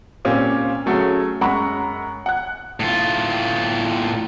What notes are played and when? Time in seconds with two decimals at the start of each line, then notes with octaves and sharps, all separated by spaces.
0.25 A#2 C4 C#4 G4 F5
0.86 F#3 A3 C#4 F#4 G#4 C#5
1.41 F#2 G#3 F#5 A#5 B5 C#6
2.26 F#5 F#6
2.80 A2 F4